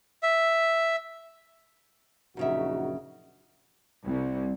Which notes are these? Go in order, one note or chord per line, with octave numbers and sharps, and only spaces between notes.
E5
A#1 F#2 C#3 D#4 F#4 E5
C2